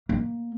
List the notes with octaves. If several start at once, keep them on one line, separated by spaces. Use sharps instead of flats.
A#3